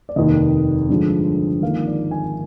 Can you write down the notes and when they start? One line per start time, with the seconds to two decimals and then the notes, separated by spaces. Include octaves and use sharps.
0.09 D5
0.16 F1 D#2 D#3 D#5
0.89 G2 D3 F3 G#3
1.62 G#1 G#2 F3 A#3 F5
1.87 D5
2.11 G#5